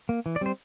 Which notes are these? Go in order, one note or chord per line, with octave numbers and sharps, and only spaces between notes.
A#3
E3
D5
G3 C4 C5